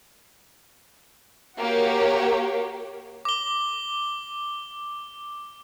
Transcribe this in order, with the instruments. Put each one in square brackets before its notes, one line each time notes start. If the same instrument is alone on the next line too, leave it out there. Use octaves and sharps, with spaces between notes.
[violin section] A#3 F#4 G4 C#5
[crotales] D6 G7